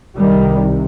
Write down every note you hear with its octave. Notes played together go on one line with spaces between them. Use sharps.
C2 C3 D#3 G3